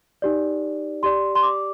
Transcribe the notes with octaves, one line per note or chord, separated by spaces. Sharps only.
D#4 G4 D5
G4 D5 C6
C6
D6